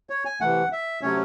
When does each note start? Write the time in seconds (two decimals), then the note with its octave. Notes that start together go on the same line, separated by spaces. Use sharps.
0.10 C#5
0.25 G#5
0.41 C3 E3 A3 F#5
0.72 E5
1.02 C3 F#3 A3 C#4 C#5